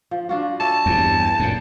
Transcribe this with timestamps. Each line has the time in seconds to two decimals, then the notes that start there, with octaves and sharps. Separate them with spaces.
0.11 F3
0.29 D4 F4 F#4
0.60 C#5 D5 E5 A5
0.86 E2 G2
1.40 F#2 A#2